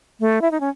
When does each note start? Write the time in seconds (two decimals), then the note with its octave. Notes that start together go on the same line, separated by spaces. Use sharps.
0.20 A3
0.42 E4
0.51 D#4
0.60 C#4